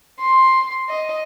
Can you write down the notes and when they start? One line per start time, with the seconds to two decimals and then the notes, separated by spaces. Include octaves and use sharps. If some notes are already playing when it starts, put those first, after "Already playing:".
0.19 C6
0.89 D#5